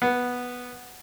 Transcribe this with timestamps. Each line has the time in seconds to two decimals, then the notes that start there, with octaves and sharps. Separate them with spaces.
0.02 B3